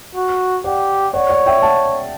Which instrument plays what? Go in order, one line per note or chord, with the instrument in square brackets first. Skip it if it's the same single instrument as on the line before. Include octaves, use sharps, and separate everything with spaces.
[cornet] F#4
[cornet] G4 [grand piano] D5 F#5
[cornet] C#5 [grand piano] D5 F#5
[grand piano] D5 F#5
E5 G5
F#5 A5